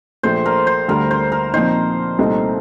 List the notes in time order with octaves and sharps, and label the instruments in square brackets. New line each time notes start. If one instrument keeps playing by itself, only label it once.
[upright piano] A#1 A#2 A3 [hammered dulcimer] C5
[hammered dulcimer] A#4
C5
[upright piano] D2 D3 G3 [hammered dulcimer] A#4
[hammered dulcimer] C5
A#4
[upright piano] A#2 F3 C4 D#4 [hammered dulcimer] C5
[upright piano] C2 A#2 A3 C4 D#4